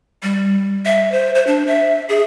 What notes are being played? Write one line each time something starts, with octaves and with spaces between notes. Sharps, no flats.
G3
E5
C5
C5
D4
E5
G#4